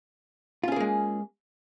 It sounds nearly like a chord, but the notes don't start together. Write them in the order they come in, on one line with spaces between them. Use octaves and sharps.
F4 C#4 G#4 A#3 G#3